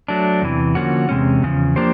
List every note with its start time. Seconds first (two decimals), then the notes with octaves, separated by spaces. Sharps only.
0.08 F#3 A3 D4
0.42 E2 C3 E3
0.75 D3 F3 A#3 C#4 F#4
1.09 E2 C3 E3 G#3 C#4
1.43 E2 C#3 F3
1.76 F3 A#3 D4 G4 C5